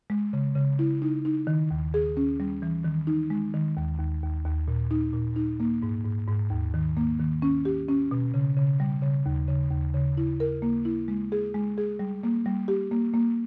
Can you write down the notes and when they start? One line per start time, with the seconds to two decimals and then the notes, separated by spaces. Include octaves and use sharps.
0.10 G#3
0.33 C#3
0.56 C#3
0.79 E4
1.02 D#4
1.25 D#4
1.47 D#3
1.71 D#2
1.94 G#4
2.17 C#4
2.40 G3
2.62 E3
2.84 D#3
3.07 D#4
3.30 G#3
3.54 D#3
3.77 D#2
3.99 D#2
4.23 D#2
4.45 D#2
4.68 A#2
4.91 D#4
5.13 A#2
5.36 D#4
5.60 A#3
5.82 G#2
6.05 G#2
6.28 G#2
6.50 D#2
6.74 D#3
6.97 A#3
7.20 D#3
7.42 C#4
7.65 G4
7.89 C#4
8.11 B2
8.34 C#3
8.57 C#3
8.80 G3
9.02 C#3
9.26 D#2
9.48 C#3
9.71 D#2
9.94 C#3
10.17 E4
10.40 A#4
10.62 A#3
10.85 E4
11.08 G#3
11.32 G#4
11.54 G#3
11.78 G#4
11.99 G3
12.23 A#3
12.46 G3
12.68 G4
12.91 A#3
13.14 A#3